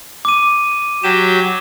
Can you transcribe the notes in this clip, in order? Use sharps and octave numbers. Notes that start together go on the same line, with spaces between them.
D6 D#7
F#3 G4 E7